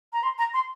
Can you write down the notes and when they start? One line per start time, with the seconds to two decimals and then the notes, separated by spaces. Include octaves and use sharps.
0.13 A#5
0.23 C6
0.38 A#5
0.54 C6